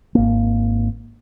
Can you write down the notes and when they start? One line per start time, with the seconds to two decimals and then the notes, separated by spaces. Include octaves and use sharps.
0.15 G#1 A#3